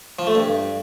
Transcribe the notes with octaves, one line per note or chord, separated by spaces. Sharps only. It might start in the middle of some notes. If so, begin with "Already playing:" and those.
F3
A3
G2